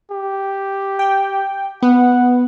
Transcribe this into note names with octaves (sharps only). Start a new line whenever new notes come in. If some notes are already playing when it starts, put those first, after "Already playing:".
G4
G5
B3 F#5